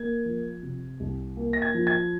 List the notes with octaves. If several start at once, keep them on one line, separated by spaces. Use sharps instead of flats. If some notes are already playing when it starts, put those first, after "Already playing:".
Already playing: A#3 G#6
F3
C3
C2
A#3
A#6
G#6
F3
G#6